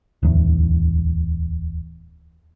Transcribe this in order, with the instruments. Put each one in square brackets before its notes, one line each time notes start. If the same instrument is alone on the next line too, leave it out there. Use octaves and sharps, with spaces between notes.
[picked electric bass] D1 E2